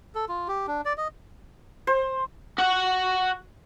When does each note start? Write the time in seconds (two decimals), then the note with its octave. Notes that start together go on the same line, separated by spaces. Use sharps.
0.15 A4
0.29 F4
0.48 G4
0.67 D4
0.85 D5
0.97 D#5
1.87 C5
2.59 F#4 F#5